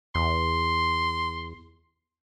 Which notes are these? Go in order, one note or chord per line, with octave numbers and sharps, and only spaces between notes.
E2 C6